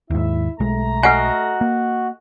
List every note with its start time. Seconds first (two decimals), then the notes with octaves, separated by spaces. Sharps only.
0.10 D#2 G#2 E4 E5
0.60 B1 G#3 A3 A#5
1.03 F#4 A4 D#5 F#5 G#5 F6
1.61 A#3